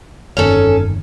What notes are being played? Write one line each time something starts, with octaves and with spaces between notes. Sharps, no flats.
G1 F2 D#3 C#4 G#4 A4